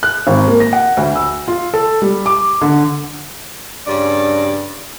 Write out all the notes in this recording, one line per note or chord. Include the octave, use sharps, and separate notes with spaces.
F#6
G#1
A#3
A#6
F#5
D2
E6
F4
A4
G3
D6
D3
G2 C#3 D5